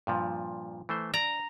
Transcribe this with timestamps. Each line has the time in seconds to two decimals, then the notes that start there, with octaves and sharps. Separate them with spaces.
0.07 G2 A#2 F3
0.89 E3 A3 C5
1.14 D5 A#5